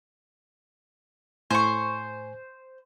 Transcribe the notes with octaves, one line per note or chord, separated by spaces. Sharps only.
A2 C5 G#5 C#6